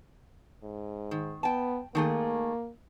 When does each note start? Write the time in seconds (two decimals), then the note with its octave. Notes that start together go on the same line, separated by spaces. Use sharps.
0.63 G#2
1.11 D#3
1.43 B3 G5 A5
1.95 D#3 A3 A#3 G#4